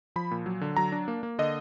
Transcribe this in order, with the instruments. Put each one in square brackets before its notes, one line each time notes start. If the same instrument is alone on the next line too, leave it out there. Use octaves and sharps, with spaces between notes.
[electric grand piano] F3 B5
A#2
F#3
D3
F#3 A#5
D4
A#3
A#3
D3 D#5